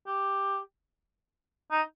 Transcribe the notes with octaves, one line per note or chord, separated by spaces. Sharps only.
G4
D#4